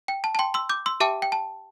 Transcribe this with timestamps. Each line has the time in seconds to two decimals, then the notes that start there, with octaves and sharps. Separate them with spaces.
0.08 G5
0.24 A5
0.35 A5
0.39 G5 C6
0.54 C6 E6
0.69 D6 G6
0.86 C6 E6
1.00 G4 E5 G5 A5 D6
1.22 G5
1.32 A5